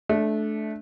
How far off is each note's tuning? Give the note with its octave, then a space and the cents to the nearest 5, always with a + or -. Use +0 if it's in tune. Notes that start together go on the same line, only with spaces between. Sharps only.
A3 -20 D4 +0